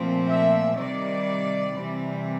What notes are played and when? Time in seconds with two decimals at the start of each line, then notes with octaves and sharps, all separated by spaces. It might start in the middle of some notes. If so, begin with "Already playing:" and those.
Already playing: A#2 F3 A3 C4
0.27 E5
0.75 C3 D#3 G3 D5
1.73 C3 E3 G3 C4